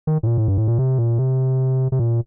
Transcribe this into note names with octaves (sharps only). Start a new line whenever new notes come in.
D#3
A2
A#2
A2
G2
A2
A#2
C3
A#2
C3
C3
A#2